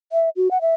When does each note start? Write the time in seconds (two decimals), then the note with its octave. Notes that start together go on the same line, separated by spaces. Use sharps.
0.12 E5
0.36 F#4
0.51 F#5
0.61 E5